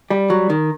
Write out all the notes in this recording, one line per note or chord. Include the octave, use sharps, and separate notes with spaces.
G3
F#3
D#3